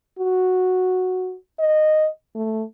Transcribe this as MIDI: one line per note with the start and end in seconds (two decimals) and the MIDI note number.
0.19 1.35 66
1.60 2.08 75
2.35 2.64 57